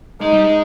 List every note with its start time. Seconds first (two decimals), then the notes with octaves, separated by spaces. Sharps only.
0.21 G#3 D#4
0.33 G3
0.44 G#3